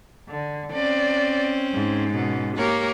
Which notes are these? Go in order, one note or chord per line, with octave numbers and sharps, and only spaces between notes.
D3
C4 C#4 D5
G#2
B2 C#4
A#3 G4 A#4 C#5